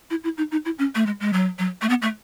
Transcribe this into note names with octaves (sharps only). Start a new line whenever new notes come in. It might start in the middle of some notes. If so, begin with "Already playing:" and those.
E4
E4
D#4
D#4
E4
C#4
A3
G#3
G#3
F#3
F#3
A3
B3
A3